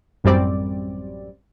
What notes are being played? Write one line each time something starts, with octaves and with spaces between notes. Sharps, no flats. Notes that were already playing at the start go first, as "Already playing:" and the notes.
A1 F#2 G3 C4 D5